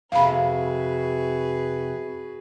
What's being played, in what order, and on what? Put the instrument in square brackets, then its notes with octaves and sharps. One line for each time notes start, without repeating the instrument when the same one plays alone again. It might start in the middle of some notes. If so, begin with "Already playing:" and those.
[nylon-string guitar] F2 C3 [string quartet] F#4 G#4 B4 [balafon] F5 B5